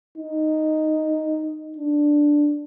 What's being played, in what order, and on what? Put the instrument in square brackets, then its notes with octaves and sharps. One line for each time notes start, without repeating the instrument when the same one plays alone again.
[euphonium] D#4
D4